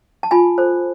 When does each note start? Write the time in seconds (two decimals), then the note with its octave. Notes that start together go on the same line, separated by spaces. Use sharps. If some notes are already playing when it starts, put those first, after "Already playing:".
0.23 A5
0.31 F4 G#5 B5
0.58 A4 C5